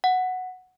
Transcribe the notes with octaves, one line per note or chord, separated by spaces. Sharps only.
F#5